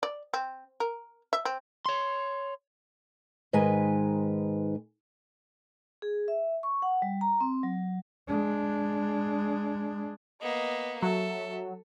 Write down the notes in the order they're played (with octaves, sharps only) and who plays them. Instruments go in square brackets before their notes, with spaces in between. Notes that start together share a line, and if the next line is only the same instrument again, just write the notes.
[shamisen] D5
C4
A#4
E5
C4
[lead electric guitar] C#5 C6
[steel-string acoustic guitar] G#2 D#3 G#3 B4 G#5
[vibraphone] G#4
E5
C#6
F#5
G3
A#5
C4
F#3
[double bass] G#3 D4
[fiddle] A#3 B3 [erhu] D#5
[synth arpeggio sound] F#3 [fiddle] A4 [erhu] E5